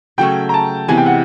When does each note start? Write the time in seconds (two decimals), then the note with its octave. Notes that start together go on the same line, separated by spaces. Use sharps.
0.18 C#3 F#3 A3 C#4 G5
0.49 A#5
0.54 A5
0.88 C3 E3 G#3 B3 G#5
0.98 G5
1.06 F#5